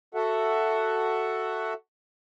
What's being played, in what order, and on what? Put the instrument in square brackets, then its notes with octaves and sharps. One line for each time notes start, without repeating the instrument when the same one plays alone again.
[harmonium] F#4 A4 E5 F#5